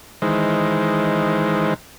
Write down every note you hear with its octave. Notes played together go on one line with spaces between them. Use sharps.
D#3 E3 G#3 C5